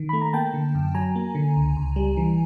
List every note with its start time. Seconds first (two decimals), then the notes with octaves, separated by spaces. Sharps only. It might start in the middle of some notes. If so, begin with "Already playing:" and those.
Already playing: D#3
0.09 A3 B5
0.21 A#5
0.33 A#3 G5 A5
0.54 D3
0.75 F#2
0.94 F#3 G#5 A#5
1.15 A#3
1.35 D3
1.56 C#2
1.77 C#2
1.96 G3
2.17 E3